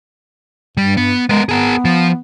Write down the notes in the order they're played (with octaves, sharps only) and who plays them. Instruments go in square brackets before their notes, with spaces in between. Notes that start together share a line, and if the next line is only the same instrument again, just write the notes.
[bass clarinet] G2 [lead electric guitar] G3
[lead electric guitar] B3
[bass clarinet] G#3 [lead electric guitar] B3 A#4
[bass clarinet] B3 [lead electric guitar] G#4 A#4
[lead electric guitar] F3